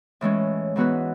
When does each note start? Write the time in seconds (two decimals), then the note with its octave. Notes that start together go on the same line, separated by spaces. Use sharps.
0.21 A2 E3 G#3 C#4
0.76 G#2 E3 B3 F#4 B4